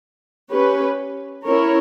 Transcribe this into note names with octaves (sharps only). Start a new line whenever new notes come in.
C#4 G4 B4
C#4 E4 A#4 C#5